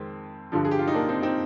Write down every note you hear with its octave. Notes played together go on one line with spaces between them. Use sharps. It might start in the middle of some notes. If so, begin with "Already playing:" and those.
Already playing: F2 D#3 G#3 C4
G2 D3 F3
G#4
G4
F4
D#4
A#3 D4
C4 D#4
C4 D#4